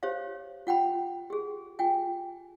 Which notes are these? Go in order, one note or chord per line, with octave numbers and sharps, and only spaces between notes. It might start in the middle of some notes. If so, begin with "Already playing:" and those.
G4 C5 C#5 F5
F4 F#5 G5 B5
G4 G#4
F4 G5 G#5